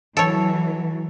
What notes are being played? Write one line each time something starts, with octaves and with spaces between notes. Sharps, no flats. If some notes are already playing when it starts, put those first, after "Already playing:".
E3 F#3 A4 C#5